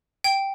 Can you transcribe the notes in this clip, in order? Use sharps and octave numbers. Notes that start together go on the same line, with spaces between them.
G5